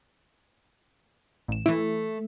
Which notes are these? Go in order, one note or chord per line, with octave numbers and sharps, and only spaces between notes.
A1 E7
E3 A3 E4